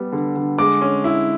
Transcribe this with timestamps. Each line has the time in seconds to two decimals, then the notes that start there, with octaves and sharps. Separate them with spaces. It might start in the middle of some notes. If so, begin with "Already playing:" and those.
Already playing: G3 B3
0.12 D3
0.36 D3
0.59 G#3 D6
0.81 C#4
1.04 E4